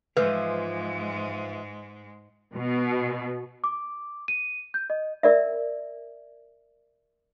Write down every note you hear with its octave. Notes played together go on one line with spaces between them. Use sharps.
G#2 E3 F3 G#3 B4
B2
D6
D#7
G6
D#5
A#4 D5 E5